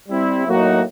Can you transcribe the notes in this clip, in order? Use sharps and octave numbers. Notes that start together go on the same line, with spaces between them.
G3 C4 E4
A2 F#3 A#3 D#4 F#4